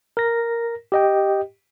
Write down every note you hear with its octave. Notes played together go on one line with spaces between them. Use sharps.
A#4 A#6
G4 D#5 G5